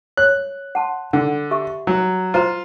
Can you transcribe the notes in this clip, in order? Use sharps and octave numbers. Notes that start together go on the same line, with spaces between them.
C#5 F#6
F#5 A5 C6
D3 F#5
G4 E5 C#6
F#3
F4 C5 A#5